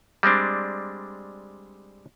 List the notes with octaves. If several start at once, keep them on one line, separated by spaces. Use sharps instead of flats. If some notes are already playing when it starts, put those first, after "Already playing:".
G3 G#3 C4 D4